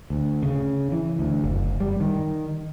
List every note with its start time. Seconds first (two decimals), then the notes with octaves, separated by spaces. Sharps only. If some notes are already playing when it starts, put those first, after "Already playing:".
0.10 D2
0.43 C#3
0.92 E3
1.19 D2
1.44 F#1
1.80 G3
2.00 D#3